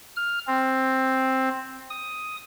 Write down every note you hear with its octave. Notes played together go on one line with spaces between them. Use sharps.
F6
C4
D#6